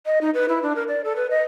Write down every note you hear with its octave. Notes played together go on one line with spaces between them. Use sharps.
D#5
D#4
B4
E4
D4
A#4
D5
A4
B4
D#5